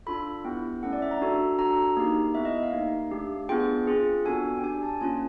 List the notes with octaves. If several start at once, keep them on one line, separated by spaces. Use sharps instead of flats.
D4 F4 A4 B5
B3 E4 G4 G5
A3 C#4 E4 A4 F#5
D5
E5
A#5
D4 F#4 A4
D4 F#4 A4 A#5
A#3 D#4 G4
B3 E4 A4 E5
D#5
E5
F5
A#3 D#4 G4
A3 D4 G4
B3 D4 F4 G#4 G5
C4 F4 G#4
B3 D4 F#4 A4 G#5
G5
D4 G4 G#5
A5
A#3 C#4 F4 G#5